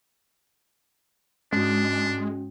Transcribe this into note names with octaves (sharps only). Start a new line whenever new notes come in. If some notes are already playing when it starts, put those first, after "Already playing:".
G#2 G#3 C#4 D4 F#4